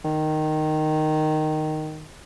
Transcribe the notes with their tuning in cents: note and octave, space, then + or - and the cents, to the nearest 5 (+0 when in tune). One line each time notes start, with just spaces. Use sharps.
D#3 -10